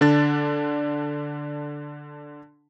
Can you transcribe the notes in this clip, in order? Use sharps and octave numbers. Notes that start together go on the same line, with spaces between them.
D3 D4 A6